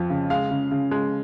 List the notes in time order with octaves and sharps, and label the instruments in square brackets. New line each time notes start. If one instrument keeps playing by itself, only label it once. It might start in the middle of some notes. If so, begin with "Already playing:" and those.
Already playing: [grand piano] F2 F3
C#3
G#3 F5
C#3
C#3
G#3